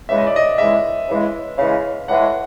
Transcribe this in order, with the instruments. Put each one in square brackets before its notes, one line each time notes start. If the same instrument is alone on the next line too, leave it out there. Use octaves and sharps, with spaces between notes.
[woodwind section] C#3 E3 G#3 [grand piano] E5
[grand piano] D#5
D5
D#5
[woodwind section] C#3 E3 G#3 [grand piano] E5
[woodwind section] C#3 E3 G#3
[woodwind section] C#3 E3 G#3 [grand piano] F5
[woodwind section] A2 E3 G#3 [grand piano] F#5